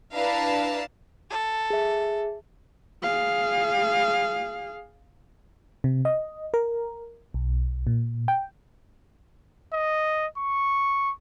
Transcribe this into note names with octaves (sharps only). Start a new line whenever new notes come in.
D4 E4 B4 F5 A5 A#5
A4
G#4 E5
G#4 F5
C3
D#5
A#4
B1
A#2
G5
D#5
C#6